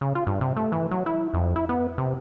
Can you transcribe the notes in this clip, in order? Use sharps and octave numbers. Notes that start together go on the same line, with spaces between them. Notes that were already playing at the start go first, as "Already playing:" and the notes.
C#3
F4
G2
C3
A3
E3
F#3
E4
F2
E4
B3
C3